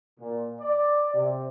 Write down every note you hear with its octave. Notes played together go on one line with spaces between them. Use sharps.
A#2
D5
C3